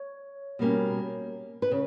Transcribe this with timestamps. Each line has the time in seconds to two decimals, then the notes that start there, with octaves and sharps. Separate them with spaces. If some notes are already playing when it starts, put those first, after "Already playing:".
Already playing: C#5
0.59 B2 G3 A#3 C#4
1.62 B4
1.71 C#3